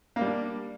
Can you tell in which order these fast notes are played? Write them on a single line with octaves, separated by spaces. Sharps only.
A#3 G3 D4